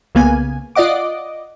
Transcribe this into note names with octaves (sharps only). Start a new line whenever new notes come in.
C2 C#3 A#3 B3 G#5
F4 D5 D#5 F#5 D6